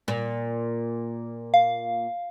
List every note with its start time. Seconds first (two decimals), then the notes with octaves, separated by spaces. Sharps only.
0.08 A#2
1.54 F5